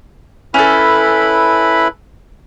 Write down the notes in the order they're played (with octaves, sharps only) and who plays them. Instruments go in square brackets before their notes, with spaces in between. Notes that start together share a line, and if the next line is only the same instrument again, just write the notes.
[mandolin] C#4 A4 [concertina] E4 B4 B5